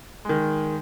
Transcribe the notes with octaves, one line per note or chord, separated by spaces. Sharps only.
D#3 G#3